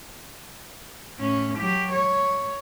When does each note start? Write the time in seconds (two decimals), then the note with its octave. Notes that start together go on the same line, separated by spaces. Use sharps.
1.19 A2 C#4
1.58 F#3 G4
1.92 C#5